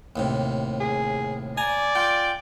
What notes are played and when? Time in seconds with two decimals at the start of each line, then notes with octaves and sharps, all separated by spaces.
0.16 D#2 A2 C3
0.80 G#4
1.58 D5 G#5 A#5
1.95 F4 G5